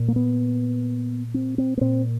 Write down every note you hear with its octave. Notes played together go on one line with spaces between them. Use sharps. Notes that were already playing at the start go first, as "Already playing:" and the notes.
Already playing: A#2
A#3
B3
C4
C4
B3
A#2 C4